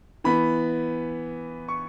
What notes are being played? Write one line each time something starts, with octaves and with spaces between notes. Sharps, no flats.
E3 B3 B5
C#6